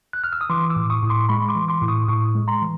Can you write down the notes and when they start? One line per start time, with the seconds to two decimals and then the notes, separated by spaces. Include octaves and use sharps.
0.13 F#6
0.24 F6
0.33 E6
0.41 D#6
0.50 E3 C6 D6
0.70 D6 E6
0.76 A2
0.90 C#6 D#6
1.02 A2
1.10 C6 D6
1.29 G#3 B5 C#6
1.49 C6 D6
1.55 E3
1.68 C6 D6
1.82 A2
1.88 C#6 D#6
2.08 A2 C#6 D#6
2.35 G#3
2.48 A#5 C6
2.62 E3